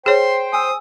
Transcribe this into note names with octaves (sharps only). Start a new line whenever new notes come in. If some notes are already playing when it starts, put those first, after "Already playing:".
G#4 C5 C#5 G5 C6
G#5 D#6 E6